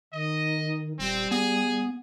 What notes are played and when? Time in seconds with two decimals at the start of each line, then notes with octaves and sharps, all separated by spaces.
0.13 D#3 D#5
0.99 D#1 G3 C4
1.31 B3 G#4